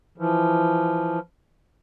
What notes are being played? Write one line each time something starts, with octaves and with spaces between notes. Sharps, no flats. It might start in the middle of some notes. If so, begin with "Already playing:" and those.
E3 F3